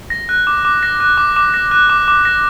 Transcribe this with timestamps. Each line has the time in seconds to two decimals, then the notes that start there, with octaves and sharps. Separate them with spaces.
0.10 A#6
0.29 F#6
0.47 D6
0.65 D6
0.83 A#6
1.00 F#6
1.17 D6
1.36 D6
1.54 A#6
1.71 F#6
1.90 D6
2.08 D6
2.25 A#6